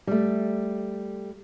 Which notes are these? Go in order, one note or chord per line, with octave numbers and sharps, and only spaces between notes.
G3 A3